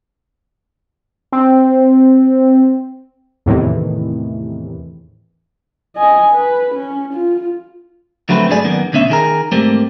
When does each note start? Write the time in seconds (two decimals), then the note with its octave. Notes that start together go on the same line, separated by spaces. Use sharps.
1.32 C4
3.46 E2 A2 C3 D#3 E3
5.96 D#5 G#5
6.34 B4
6.75 C#4
7.13 F4
8.29 F2 D3 F#3 A3 C4 B4
8.50 G#2 F#3 A3 G#4 D5 G#5
8.64 F#2 D#3 A#3 B3
8.93 D2 B2 B3 C#4 E5
9.10 D#3 G#4 A#4
9.52 G#2 G3 A3 A#3 C4